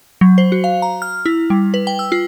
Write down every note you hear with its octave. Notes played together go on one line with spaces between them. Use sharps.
F#3
C5
F#4
F5
A#5
F6
E4
G3
B4
G5
E6
F4